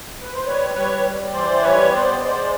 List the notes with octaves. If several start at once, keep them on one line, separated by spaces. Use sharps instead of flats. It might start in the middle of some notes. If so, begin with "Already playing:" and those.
B4
C5
G3 B4 C#5
G3 B4 C#5
G3
E3 C5 D5
G3 B4 C#5
B3 C5 D5
G#3 C5 D5